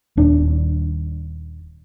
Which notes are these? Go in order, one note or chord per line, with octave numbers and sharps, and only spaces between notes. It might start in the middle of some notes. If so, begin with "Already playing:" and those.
D#1 D4